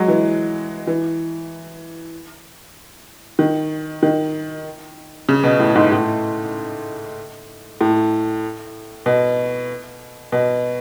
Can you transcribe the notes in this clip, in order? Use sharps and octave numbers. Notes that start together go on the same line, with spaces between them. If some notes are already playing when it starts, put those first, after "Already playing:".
Already playing: F#3 G#3
E3
E3
D#3
D#3
C#3
B2
A2
G#2
A2
A2
B2
B2